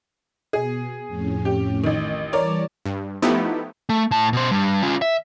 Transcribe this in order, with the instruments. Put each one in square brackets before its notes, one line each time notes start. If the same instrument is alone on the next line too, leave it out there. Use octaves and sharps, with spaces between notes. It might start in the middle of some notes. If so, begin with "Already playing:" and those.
[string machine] B2 [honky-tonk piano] G#4
[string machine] F2 A2 C#4
[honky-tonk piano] G4
A1 D#3
[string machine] E3 G3 A5 [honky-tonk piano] A#4 C#5 D5
[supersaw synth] G2
F3 A3 B3 D#4 E4 G4
[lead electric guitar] A3
A2 A5
B2 C5
G2
C#4 F4
E5